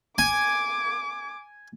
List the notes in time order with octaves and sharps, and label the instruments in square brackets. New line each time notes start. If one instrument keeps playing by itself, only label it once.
[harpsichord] G#5 [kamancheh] D6